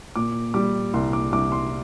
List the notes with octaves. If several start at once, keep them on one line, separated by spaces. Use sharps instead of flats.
A#2 D6
G3 D6
C2 C6
D6
C2 D6
C6